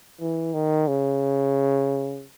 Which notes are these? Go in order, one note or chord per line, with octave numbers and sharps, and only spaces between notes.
E3
D#3
C#3